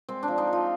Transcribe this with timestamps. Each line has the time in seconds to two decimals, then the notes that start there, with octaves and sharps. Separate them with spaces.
0.09 G#3 C4
0.23 D4
0.28 F3
0.38 D#4
0.47 F3
0.53 F4